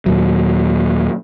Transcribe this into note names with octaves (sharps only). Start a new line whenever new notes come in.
D#2 A#2 F#3